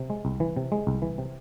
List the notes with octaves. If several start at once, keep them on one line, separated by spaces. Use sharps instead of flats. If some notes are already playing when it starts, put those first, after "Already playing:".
Already playing: C3
G#3
C2
E3
C3
G#3
C2
E3
C3